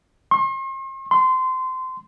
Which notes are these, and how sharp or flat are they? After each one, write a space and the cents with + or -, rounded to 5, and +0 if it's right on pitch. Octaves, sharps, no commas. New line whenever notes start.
C6 +45
C6 -20